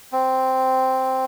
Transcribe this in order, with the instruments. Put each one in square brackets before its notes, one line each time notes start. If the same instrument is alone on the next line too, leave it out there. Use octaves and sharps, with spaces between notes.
[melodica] C4